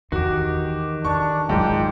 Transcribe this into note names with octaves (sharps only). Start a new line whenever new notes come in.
E2 D#3 F#4 G4
D3 D4 C#6
G#2 F#3 F4 G5